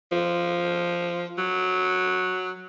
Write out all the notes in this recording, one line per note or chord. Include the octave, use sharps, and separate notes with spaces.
F3
F#3